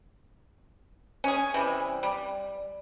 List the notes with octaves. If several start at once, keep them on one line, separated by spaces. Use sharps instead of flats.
C#4 G#4
C3 E3 G3
G3